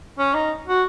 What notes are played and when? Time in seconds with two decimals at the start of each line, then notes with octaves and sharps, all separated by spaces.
0.18 C#4
0.34 D#4
0.67 F#4